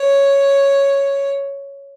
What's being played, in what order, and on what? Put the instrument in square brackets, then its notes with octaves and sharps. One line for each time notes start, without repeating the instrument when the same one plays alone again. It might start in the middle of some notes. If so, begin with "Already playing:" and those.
Already playing: [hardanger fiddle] C#5